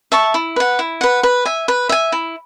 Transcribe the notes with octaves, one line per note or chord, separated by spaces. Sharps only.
E5 A5 C#6
E4
B4 F#5
E4
B4 F#5
B4
E5 G#5
B4
E5 G#5
E4